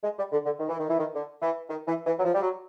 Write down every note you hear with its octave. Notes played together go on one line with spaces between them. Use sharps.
G#3
G3
D3
D3
D#3
E3
D#3
E3
D#3
D3
E3
D#3
E3
E3
F#3
F3
G3
F#3